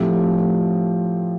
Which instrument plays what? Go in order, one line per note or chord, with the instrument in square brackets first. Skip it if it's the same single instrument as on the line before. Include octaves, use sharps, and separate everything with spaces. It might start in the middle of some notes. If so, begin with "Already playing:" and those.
Already playing: [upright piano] A2 F3 A3 C4 G4